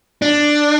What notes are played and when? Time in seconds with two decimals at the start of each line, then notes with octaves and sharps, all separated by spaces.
0.22 D4